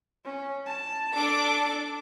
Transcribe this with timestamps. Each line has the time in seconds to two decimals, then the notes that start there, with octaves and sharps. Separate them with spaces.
0.25 C#4
0.66 A5
1.15 D4 A4 D6